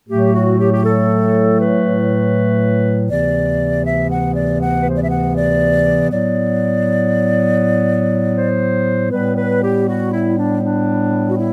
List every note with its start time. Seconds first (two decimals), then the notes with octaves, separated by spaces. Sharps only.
0.09 A2 F#3 A3 G4
0.34 F#4
0.59 G4
0.73 G4
0.84 A4
1.59 B4
3.10 D2 C3 E3 B3 D5
3.85 E5
4.10 F#5
4.35 D5
4.61 F#5
4.81 B4
4.88 C5
4.96 D5
5.03 E5
5.10 F#5
5.35 D5
6.11 A2 F#3 B3 D5
8.37 C5
9.12 A2 G3 B3 B4
9.36 B4
9.62 G4
9.87 F#4
10.12 E4
10.37 D4
10.62 D4
11.28 F#4
11.38 E4